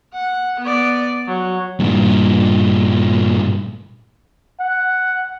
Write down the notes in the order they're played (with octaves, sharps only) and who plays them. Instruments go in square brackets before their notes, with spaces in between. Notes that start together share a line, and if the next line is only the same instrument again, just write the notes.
[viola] F#5
B3 D5
F#3
[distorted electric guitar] G2 A#2
[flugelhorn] F#5